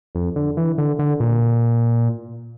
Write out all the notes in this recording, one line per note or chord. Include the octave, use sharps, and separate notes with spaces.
F2
D3
E3
D3
D3
A#2